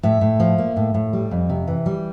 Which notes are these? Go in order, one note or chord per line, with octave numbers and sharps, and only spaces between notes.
A2 E5
A2
F3
A#3
A2
A2
G3
F2
C3
E3
G3